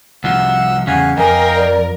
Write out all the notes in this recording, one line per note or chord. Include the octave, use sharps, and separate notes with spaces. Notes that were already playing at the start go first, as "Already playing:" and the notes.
C2 F3 F#5 E6
E2 C#3 F5 F#5 G#5
F2 A#4 D#5 F5 G5 G#5
D5